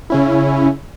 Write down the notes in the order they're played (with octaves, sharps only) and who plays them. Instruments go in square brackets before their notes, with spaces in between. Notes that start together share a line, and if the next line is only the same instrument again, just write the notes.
[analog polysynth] C#3 C#4 E4